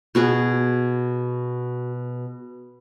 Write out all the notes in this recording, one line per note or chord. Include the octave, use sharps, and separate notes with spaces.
B2 F#4 G#4